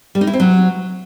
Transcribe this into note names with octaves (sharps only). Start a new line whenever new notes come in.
G3
D#4
E4
C4
F#3